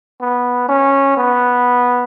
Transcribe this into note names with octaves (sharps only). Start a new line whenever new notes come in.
B3
C#4
B3